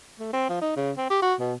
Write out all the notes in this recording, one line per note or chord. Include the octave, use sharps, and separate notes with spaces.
A3
C4
F3
D#4
C#3
C4
G4
F#4
B2